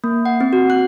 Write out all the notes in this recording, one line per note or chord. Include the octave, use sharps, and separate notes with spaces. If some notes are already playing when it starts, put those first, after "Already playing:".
A#3
F#5
C4
F#4
F#6